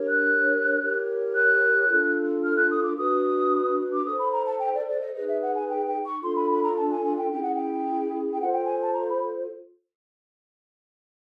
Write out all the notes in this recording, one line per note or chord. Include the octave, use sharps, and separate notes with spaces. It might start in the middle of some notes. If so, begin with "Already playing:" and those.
Already playing: D4 G4 A#4 C#5
F#6
E4 G4 A#4 C#5
F#6
D4 F4 A4
F6
F#6
D#6
D6
D4 F#4 B4 D#6
D6
E4 A4 C5 D#6
B5
A#5
A5
G5
D5
D5
D#5
D#4 G#4 B4 D#5
E5
F#5
G#5
G5
G5
C#6
D4 F4 A4 C6
B5
B5
A#5
A5
G#5
G#5
G5
C#4 E4 G#4 G5
F#5
G5
G5
F4 A4 C5 F#5
G5
G#5
A5
A#5
B5